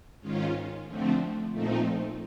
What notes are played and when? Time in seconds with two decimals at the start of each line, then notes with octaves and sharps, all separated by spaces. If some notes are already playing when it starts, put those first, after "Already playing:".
0.21 G#2 D#3 G#3 C#4 F4
0.86 D3 F3 A3 C4
1.51 A#2 F3 A3 C4 D#4